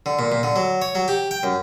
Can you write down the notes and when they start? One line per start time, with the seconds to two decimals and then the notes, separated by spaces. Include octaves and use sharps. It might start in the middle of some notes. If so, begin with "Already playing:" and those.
0.06 D3
0.19 A#2
0.32 A#2
0.43 D3
0.56 F#3
0.82 C#5
0.95 F#3
1.08 G4
1.31 G5
1.43 F#2